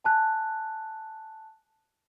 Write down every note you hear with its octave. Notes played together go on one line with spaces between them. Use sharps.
G#5 A5 F#6